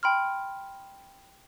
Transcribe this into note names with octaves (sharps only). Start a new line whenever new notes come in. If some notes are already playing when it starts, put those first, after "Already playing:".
G5 B5 C6 F6